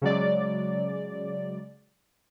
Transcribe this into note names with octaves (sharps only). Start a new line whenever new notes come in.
C#3 F#3 G#3 D5